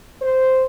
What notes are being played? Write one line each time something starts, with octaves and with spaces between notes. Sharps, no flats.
C5